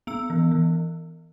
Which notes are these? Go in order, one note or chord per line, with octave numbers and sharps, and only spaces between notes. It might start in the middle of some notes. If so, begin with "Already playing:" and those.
B3 E6
E3
E3